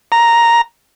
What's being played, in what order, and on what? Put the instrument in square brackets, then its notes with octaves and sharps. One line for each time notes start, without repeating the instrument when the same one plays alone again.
[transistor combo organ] A#5